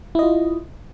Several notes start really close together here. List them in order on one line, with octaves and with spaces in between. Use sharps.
E4 D#5 F4